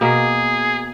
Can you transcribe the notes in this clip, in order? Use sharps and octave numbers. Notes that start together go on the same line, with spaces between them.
B2 A#3 G#4